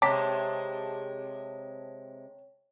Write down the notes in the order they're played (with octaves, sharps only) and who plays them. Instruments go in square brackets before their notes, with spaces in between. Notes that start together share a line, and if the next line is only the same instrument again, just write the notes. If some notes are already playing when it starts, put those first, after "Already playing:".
[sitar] C3 G#3 [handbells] C#5 G5 [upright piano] A5 A#5 [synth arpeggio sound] D6 B6